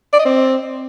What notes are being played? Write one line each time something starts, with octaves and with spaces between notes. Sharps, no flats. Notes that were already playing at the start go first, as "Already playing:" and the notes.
D5
D#5
C4